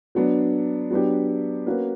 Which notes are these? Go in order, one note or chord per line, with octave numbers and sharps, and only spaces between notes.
F#3 B3 D4
F#3 B3 D4 G4
A#3 C#4 F#4 B4